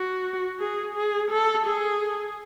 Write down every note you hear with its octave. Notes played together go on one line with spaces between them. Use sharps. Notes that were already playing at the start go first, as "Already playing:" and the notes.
Already playing: F#4
G#4
G#4
A4
G#4